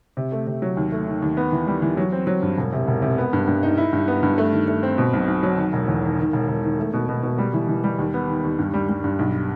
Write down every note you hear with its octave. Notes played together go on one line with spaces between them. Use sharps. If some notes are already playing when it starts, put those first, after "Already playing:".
C3
A3
C3
F#3
D#2
A3
D#3
D#2
B3
E3
G3
E3
F#3
C4
F#3
G2
E1
C3
E1
C3
B3
G2
G2
D#4
E4
G2
B3
G2
A3
D#3
A3
C4
B2
B1
B1
F#3
D#3
E1
E2
D#3
D#3
E1
E1
D#3
A3
B2
B2
B2
G3
E3
E3
G3
D#2
B3
D#3
D#2
G2
G3
G3
G2
B1